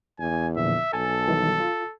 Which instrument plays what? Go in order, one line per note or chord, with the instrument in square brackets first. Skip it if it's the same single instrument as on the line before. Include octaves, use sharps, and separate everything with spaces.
[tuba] E2 [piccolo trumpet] G#5
[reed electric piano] A#2 D3 F3 [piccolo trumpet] E5
[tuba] B1 [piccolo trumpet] A4 [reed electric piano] G#5 A5
[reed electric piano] D#3 E3 G3
F4